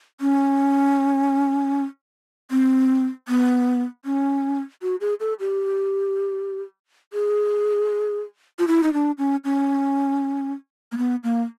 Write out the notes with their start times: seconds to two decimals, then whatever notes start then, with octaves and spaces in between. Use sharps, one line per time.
0.21 C#4
2.51 C4
3.28 B3
4.05 C#4
4.82 F#4
5.01 G#4
5.20 A4
5.40 G4
7.13 G#4
8.59 F4
8.68 E4
8.83 D#4
8.93 D4
9.18 C#4
9.44 C#4
10.92 A#3
10.98 B3
11.24 A#3